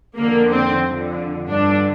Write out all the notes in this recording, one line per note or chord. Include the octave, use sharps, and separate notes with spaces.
F2 D3 A#3
C4
F2 D3
G2 D3 D4